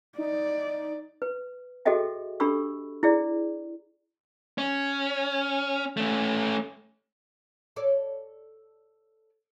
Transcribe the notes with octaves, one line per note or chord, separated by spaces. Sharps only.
D#4 D5
B4
F#4 G#4 A4 D#5 E5 G5
D4 G4 A4 B5 C#6 E6
E4 G#4 D5
C#4
A3 C#4
A4 C#5 D5